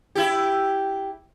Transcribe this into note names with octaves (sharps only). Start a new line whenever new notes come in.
E4 G4